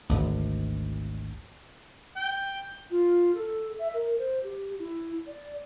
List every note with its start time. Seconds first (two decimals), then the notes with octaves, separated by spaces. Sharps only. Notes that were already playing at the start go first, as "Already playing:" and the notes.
0.09 G#1 D2
2.16 G5
2.91 F4
3.35 A4
3.79 E5
3.94 A#4
4.18 C5
4.43 G4
4.79 E4
5.27 D5